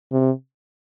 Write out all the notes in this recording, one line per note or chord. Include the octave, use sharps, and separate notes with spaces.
C3